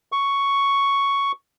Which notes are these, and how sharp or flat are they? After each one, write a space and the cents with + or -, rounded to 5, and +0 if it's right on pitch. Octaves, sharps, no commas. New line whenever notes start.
C#6 +5